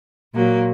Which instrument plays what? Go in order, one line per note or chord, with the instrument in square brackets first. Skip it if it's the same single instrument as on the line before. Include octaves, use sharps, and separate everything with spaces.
[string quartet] A#2 F#3 A#3